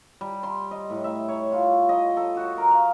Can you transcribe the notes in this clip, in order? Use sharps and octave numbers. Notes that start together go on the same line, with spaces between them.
G3
C6
D#5
A2
E5
C#5
F4
D#5
A4
F#4
A#4
F5